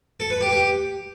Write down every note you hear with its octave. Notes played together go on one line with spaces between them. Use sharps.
A4
B4
G4
G4